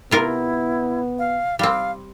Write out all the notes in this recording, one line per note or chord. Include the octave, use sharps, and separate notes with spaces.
C3 B3 E4 F4 A#4
F5
G3 C4 F5